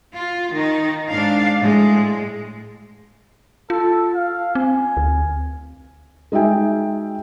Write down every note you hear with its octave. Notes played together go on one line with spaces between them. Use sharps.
F4
D#3 D#4
G#2 D4 F5
A2 G#3
F4 A4
F5
C4 G#5
D2
G#3 D#4 F#4 E5 G5 G#5